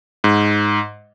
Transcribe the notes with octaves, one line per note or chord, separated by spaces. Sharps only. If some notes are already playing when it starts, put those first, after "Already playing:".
G#2